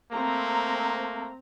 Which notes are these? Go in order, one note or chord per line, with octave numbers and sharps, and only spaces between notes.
A3 A#3 C4 A#5